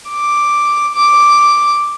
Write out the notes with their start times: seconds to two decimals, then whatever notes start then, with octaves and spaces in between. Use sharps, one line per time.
0.10 D6
0.95 D6